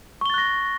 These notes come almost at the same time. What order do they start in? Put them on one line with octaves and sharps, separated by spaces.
C#6 G7 A6 F#6 A#6